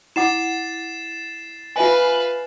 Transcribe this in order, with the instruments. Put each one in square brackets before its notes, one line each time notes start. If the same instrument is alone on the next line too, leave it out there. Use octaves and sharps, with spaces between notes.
[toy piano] E4 F#5 D6 [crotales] A6 C7 E7
[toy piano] F4 E5 G#5 [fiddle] B4 F5